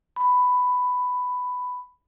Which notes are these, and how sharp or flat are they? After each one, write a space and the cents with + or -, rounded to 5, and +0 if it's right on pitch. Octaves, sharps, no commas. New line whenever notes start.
B5 +10